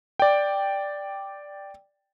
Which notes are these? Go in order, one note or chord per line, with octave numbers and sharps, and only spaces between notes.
D5 G5